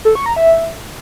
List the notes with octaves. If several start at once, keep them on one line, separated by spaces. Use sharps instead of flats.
A4
C#6
A#5
E5